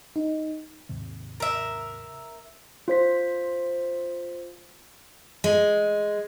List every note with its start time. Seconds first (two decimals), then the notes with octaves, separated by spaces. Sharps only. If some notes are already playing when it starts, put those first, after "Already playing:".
0.16 D#4
0.89 D#2 G#2 C3
1.40 A#4 E5
2.88 F4 C5 B6
5.44 G#3